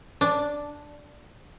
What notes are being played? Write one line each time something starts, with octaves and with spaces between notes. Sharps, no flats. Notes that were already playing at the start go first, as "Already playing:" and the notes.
D4